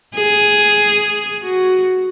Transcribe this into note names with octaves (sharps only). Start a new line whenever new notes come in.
G#4
F#4